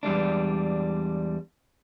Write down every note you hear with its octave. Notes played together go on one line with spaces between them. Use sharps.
E2 G3 G#3 D4